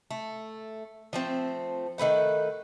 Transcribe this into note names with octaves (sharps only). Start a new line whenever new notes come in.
A3
F3 A3 C4
D#3 A3 B4 F#5